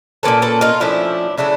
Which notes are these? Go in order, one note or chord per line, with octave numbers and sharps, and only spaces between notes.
A#2 F3 A#3 C#4 A4 B4
A4 B4
D#4 F4
A#2 F3 A3 C#4 D4 E4
C#3 F#3 A3 D4 E4